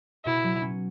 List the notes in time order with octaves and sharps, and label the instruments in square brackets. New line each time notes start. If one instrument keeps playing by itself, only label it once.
[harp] B2 [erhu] E4
[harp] F#3
C#4